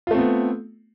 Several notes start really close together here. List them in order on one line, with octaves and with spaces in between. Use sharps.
F4 A3 C4 B3